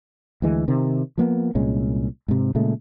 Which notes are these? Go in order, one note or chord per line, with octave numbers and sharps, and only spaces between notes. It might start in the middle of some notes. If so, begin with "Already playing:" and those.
D2 E3 G#3
C3 D#3
F3 A#3 B3
C2 A#2 G#3 C#4
G#2 C3
A#2 C#3 G#3 A3